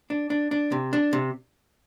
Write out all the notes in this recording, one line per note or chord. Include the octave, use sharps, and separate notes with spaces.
D4
D4
D4
C3
D4
C3